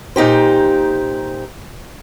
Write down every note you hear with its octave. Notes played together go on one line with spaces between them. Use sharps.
A#2 D#4 G4 C5